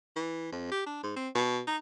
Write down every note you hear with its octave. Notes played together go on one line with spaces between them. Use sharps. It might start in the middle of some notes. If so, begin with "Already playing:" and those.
E3
F2
G4
D4
G#2
C4
B2
D#4